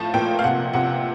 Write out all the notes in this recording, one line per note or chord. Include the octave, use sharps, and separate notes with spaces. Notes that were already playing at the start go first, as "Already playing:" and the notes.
Already playing: A2 F3 A5
A#2 G5
F5
C3 F#5
C3 F#5